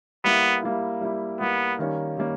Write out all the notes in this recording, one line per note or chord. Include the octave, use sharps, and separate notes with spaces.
G3 A#3 B3 E4
G3 A#3 E4
G3 A#3 E4
G3 A#3 B3 E4
D#3 G3 A#3 C#4
D#3 G3 A#3 C#4